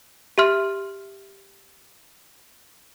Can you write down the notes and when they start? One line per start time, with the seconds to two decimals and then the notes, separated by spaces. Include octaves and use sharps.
0.38 G4 E5 C6 F6